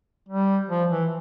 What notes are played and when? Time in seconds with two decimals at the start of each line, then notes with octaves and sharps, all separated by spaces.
0.29 G3
0.69 F3
0.91 E3